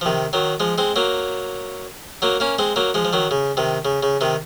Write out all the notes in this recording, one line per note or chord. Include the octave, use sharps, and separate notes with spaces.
F3
C3 D#3
D#3 F#3
F3 G#3
G#3 C4
F#3 A#3
F#3 A#3
A#3 C#4
G#3 C4
F#3 A#3
F3 G#3
F3
D#3 F#3
C#3
C3 D#3
C#3
C#3
C3 D#3